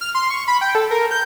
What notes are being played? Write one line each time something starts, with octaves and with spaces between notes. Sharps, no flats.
F6
C6
C#6
B5
G5
A4
A#4
G6